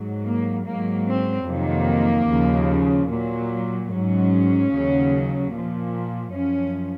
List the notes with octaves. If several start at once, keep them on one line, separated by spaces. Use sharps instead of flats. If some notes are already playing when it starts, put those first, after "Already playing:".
Already playing: G#2 F#3
A#3
G#2 F#3 A#3
C4
F2 C3 D#3 F#3 A#3
D#2 C#3 F3
A#2 F#3
G#2 F#3 C#4
D#2 C#3 F#3
A#2 F3
F#2 F3 C#4